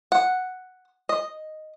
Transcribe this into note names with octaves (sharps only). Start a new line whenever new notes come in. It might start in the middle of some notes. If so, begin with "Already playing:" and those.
F#5
D#5